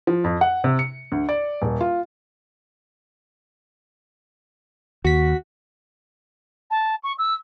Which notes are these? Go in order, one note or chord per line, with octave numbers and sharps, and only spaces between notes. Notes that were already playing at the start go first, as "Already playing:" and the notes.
F3
F2
F#5
C3
C#7
D2
D5
D#1
F4
D#2 F#4 B6
A5
C#6
E6